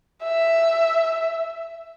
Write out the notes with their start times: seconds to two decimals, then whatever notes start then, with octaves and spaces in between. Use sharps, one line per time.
0.24 E5